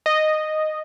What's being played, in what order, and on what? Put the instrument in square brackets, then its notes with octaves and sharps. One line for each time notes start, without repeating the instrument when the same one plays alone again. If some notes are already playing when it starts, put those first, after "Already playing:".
[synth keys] D#5